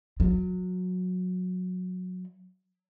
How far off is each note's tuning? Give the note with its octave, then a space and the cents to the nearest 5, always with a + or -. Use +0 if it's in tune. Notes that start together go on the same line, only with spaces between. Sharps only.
F#3 -20